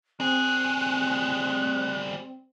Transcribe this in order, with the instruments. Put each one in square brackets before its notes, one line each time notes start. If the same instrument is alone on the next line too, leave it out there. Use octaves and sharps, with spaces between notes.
[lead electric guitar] G3 G#4 [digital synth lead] C4 [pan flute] F#6